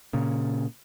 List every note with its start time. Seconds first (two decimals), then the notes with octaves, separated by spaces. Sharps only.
0.13 A#2 C#3